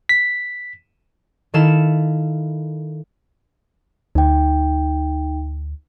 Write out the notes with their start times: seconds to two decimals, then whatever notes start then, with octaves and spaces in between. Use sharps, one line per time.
0.09 B6
1.54 D#3 E4 A4 F5 E7
4.15 D2 D#4 G5